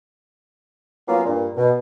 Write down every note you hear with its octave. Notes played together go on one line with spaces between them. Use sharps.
F#3 A#3 B3 C#4 F4
G2 A#2
B2